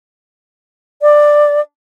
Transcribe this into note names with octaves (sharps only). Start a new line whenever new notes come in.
D5